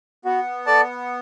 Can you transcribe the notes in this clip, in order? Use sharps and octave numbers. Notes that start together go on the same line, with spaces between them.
B3 F#4
A4 D5 A5